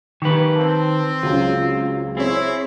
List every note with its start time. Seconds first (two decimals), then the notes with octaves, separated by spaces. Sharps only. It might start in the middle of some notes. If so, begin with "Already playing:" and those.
0.22 D#3 A#3 G4 B4 C#6
0.55 C4 A5
1.23 C#2 F#3 C#4 F4
2.17 C4 E4 G#4 C#5